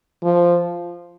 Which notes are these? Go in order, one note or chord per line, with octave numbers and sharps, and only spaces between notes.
F3